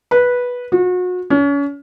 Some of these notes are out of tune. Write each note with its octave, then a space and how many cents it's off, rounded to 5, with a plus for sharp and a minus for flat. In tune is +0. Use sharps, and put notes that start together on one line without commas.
B4 -10
F#4 -35
C#4 +35